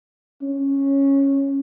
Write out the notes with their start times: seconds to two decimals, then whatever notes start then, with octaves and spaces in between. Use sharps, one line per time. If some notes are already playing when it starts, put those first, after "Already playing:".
0.42 C#4